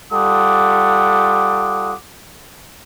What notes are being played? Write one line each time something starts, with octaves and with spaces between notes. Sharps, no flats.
G3 F4 A4 F#5 D6 D#6